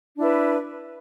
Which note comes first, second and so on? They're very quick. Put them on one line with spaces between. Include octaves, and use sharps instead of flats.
D4 E4 B4